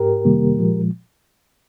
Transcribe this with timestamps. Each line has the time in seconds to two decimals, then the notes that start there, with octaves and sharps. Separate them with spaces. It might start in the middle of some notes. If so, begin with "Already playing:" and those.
Already playing: G#2 G4 A#4
0.25 F2 C3 D#3 G3 A#3
0.57 A#2 F3 G#3